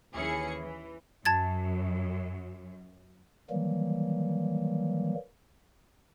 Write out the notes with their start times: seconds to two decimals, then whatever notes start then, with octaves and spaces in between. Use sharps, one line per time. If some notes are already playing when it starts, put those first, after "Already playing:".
0.14 D#2 E3 C#4 E4 G#4 C#7
0.60 E3
1.25 F#2 A5 G#6 A6
3.50 D#3 E3 F#3 G3 A#3